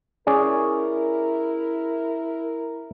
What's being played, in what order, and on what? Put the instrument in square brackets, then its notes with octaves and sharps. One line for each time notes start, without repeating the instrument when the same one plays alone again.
[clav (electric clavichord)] C#4 G#4 D5 [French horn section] E4 A#4